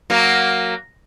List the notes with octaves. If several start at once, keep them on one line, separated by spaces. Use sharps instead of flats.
F#3 A#3